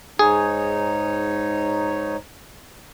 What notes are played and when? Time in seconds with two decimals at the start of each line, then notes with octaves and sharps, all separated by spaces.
0.19 G#2 D#4 G#4 C#5